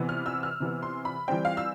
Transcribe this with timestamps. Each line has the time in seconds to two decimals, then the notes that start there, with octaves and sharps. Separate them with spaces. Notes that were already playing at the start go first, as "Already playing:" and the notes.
Already playing: C3 E3 B3
0.09 F6
0.26 E6
0.43 F6
0.60 C3 E3 B3
0.83 C6
1.05 B5
1.28 E3 G3 C4 G5
1.45 F5
1.57 E6